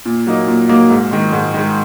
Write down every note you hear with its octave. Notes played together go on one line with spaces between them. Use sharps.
A#2
F#3 A#3 D#4
A#2
F#3 A#3 D#4
G#2
D#3 G#3
G#2
D#3 G#3